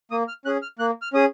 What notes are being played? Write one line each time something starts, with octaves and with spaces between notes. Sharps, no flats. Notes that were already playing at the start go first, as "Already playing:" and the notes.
A#3 D#6
F6
C#4 G#4 F#6
F6
A#3 F#6
F6
C#4 G#4 D#6